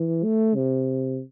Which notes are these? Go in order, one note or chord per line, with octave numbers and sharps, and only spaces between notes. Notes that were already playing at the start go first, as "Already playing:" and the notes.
Already playing: E3
A3
C3